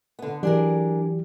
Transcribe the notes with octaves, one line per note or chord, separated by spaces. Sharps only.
D3 B3
E3 F#3 D4 G4 G#4 A#4